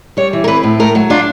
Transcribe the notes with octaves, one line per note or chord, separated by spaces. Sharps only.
G3 C#5
E3
A#4
C4 B4
A2
A3 A#4
F#3
D4 F4